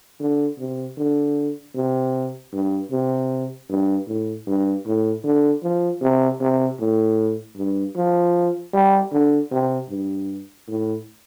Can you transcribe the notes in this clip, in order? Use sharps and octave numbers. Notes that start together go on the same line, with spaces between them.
D3
C3
D3
C3
G2
C3
G2
A2
G2
A2
D3
F3
C3
C3
A2
G2
F3
G3
D3
C3
G2
A2